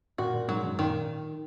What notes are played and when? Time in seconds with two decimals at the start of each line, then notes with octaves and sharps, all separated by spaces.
0.18 A#2 F#4
0.34 A#2
0.48 G#2 F#3
0.64 F#2
0.79 A#2 D#3